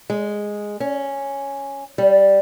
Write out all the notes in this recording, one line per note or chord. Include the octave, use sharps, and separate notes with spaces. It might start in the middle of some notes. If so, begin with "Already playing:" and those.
G#3
C#4
G3